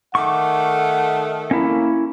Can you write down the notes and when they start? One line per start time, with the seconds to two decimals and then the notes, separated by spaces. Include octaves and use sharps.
0.15 D#3 A3 F#5 C#6 D6
1.51 A#3 C#4 E4